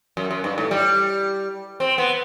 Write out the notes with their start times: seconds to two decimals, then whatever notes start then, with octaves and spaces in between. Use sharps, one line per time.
0.17 F#2
0.31 F#2
0.44 G2
0.58 A2
0.71 G3
1.80 C4
1.98 B3